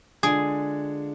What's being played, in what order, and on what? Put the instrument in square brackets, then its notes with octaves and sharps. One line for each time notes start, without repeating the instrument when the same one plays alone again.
[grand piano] D3 G#3 D4 F4 [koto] G#4